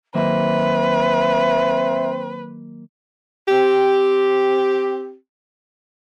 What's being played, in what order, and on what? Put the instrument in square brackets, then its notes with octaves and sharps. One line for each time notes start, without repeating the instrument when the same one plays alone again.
[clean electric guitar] D#3 F#3 A#3 [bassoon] C4 [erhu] B4 [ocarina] E5
[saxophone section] C4 G4